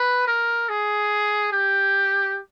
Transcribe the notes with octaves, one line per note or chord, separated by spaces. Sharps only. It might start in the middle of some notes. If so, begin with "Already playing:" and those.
Already playing: B4
A#4
G#4
G4